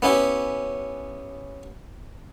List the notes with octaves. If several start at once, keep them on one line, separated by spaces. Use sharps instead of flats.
B3 C#4 E4 G4